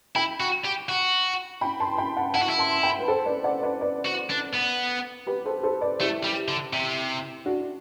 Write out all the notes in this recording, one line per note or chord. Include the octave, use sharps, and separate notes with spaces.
E4 G5 B5
F#4
G4
F#4
G5 B5
A5 C6
G5 B5
F#5 A5
E4 F#5 A5
F#4
E4
A5 C6
G5 B5
B4
A4 C5
B4 D5
D5 F#5
B4 D5
B4 D5
F#4
D4
B3
G4 B4
A4 C5
A4 C5
B4 D5
A3 E4 G4
G3
D3
C3
D4 F#4